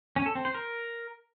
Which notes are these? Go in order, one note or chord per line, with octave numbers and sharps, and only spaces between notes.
C#4
A4
C4
C5
A#4